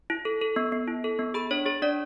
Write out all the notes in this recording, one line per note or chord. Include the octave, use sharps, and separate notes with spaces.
E4
A4
A4
B3
B3
E4
A4
B3
G#4 B5
D4 C#5
G#4 C#5
D4 D5